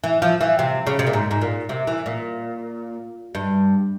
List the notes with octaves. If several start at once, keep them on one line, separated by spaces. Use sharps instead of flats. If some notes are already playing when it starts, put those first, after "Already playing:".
E3
F3
E3
C3
C#3
C3
A#2
G#2
G#2
A#2
C3
E3
A#2
G2